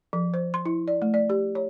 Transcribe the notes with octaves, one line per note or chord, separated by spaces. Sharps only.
F3
C5
C6
E4
D5
A3
D5
G4
C#5